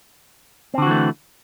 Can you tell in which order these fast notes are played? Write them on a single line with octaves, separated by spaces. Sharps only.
C4 D3 F#4 E3 A3